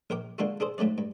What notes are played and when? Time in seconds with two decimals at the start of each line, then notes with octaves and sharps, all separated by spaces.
0.10 A#1 A#4 G5 D6
0.38 D3 G#3 A#3 D4 F4 F#4
0.60 D4 G#4 A4 C5
0.78 G#2 F#3 A3 C#4 D5
0.98 G2